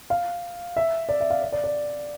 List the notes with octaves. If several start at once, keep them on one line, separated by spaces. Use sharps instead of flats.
F5
E5
D5
E5
F5
D5
D5
D5